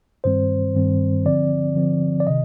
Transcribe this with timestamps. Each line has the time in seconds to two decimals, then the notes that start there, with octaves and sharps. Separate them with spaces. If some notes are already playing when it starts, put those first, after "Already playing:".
0.24 G2 D#3 G3 C4 C5
0.75 G2 D#3 G3 C4
1.25 D3 F3 C4 D5
1.75 D3 F3 C4
2.20 D5
2.27 C3 D#3 D#5